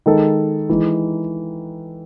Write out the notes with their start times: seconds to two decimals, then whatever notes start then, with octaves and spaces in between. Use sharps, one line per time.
0.06 D#3 G#3 D#4 A4
0.69 E3 G#3 D#4